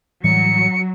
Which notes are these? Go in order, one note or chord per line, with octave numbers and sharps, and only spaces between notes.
A2 E3 F#3 G3 C#7